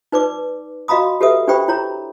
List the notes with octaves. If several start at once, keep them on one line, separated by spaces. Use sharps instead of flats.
D#4 B4 D5 D6
F#4 D#5 F5 A#5 B5 D#6
G4 A4 B4 E5 D#6
D4 G4 C5 G5 B5 C#6
E4 C#5 A#5